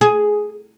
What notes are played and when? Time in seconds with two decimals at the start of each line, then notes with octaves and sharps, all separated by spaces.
0.01 G#4